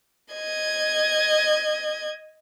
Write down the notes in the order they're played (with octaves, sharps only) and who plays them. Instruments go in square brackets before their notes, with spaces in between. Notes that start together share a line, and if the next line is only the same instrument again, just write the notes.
[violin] D#5 G#6